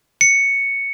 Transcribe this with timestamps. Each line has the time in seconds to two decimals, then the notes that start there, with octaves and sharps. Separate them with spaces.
0.21 C#7